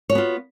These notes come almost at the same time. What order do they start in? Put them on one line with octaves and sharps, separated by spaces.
C#5 F#4 B3 F4